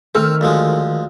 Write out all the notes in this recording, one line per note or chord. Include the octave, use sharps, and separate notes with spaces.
D#3 A3 C4 E6 F6
D2 F3 G#3